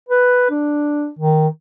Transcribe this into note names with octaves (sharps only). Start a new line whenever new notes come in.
B4
D4
D#3